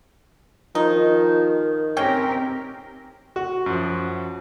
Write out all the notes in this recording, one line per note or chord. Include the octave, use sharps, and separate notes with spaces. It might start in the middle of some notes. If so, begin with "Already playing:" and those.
D#3 F3 D#4
C4 C#4 G4 A#4 C#5 G5
F#4
F#2 F3